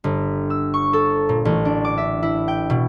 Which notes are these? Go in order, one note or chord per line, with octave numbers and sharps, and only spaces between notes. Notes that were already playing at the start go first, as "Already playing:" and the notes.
G1
E6
C#6
A4
A#2
A1
D4
D6
E5
E4
G5
B2